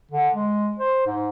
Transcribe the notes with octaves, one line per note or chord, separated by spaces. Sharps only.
D3
G#3
C5
G#2